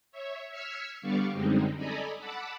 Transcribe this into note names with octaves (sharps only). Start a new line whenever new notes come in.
C#5 E5
E6 F6 G#6 B6 C#7
D3 G3 B3 D5 F5 C#6
F#2 D3 G3 G#3 C4 D#4
A4 D5 D#5 G#5 A#5 B5
F#5 A5 B5 D6 E6